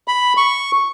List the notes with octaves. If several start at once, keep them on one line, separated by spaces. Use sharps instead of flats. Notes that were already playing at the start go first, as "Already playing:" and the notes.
B5
C#6